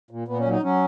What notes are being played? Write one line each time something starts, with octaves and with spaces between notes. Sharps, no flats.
A#2
A#2 B3
C#4
F#3
D#4
F#3 C#4